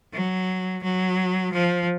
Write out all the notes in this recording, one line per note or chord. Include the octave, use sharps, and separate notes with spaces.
F#3
F#3
F3